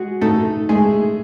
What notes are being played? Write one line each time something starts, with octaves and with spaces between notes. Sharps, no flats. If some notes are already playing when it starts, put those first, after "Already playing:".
Already playing: G#3 F#4 G#4
A3 D#4 A4
G#3 A3 G#4